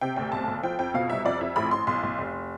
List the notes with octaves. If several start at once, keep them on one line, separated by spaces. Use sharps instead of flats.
C3 G5
D2 G5
B1 A5
B1
F3 G5
F2 G5
B2 F5
C2 E5
F2 D5
F2 E5
A1 B5
A1 C6
B1 C6
B1
F1